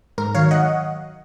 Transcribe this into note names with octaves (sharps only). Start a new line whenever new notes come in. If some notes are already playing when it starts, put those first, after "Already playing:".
G#2 A#4
D#3 F#3 C#5 F5
D#5 F#5